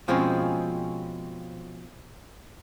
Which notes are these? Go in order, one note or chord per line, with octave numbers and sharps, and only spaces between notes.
B2 F3 G#3 C4 C#4